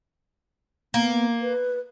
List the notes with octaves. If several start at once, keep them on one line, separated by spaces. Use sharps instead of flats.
A#3 B3
B4